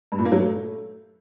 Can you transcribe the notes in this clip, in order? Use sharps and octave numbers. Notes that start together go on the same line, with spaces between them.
G2
A#2
A#3
F#3
A3